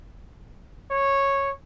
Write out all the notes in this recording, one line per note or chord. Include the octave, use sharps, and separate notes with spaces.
C#5